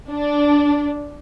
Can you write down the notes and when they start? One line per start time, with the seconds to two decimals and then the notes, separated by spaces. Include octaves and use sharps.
0.11 D4